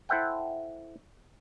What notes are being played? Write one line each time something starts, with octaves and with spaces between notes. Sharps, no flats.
E4 A4 C5 E5 F#5 G5